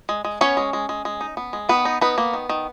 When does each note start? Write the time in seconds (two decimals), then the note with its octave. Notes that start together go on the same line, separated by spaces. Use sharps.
0.09 G#3
0.25 G#3
0.41 B3 C#4 C#5
0.57 G#3
0.73 G#3
0.89 G#3
1.05 G#3
1.21 D#4
1.37 B3
1.53 G#3
1.69 D#3 B3 B4
1.85 D#4
2.01 B3 D#4 B4
2.18 A#3
2.33 D#3
2.49 D#3